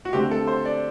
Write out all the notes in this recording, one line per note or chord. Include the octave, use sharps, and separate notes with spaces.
F#4
D3 A3 C4 G4
A4
C5
D5